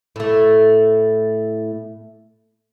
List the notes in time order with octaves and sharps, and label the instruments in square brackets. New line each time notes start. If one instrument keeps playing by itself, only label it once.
[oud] A2 A3